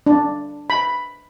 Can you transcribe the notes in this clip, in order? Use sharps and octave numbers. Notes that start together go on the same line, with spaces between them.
D4
B5